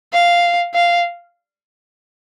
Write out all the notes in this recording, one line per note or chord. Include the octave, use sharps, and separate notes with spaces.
F5
F5